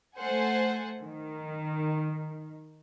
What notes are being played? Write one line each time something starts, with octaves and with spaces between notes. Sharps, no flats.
A3 A4 C5 F#5 G#5
D#3